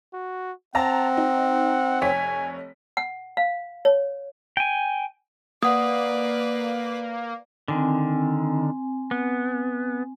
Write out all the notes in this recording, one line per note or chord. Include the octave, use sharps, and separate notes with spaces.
F#4
C4 F#5 A5 A#5 A#6
D#4
F1 C#5 G#5 B6
F#5
F5
C#5
G5 G#5
A#3 B4 D5 F#5 D#6
D3 D#3 C4 G#5
B3